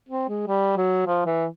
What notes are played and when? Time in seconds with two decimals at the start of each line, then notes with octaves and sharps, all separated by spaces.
0.09 C4
0.29 G#3
0.47 G3
0.77 F#3
1.07 F3
1.26 E3